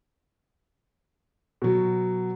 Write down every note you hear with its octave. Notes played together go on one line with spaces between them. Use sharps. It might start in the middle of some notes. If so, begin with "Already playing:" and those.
B2 F#3